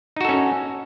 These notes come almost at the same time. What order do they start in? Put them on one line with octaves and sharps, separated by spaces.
D#4 F#4 A4 C#4